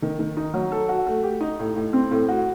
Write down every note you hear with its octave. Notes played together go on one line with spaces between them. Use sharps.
D#3
D#3
D#4
F#3
A4
F#4
A3
G4
D#4
A2
A2
C4
A2
F#4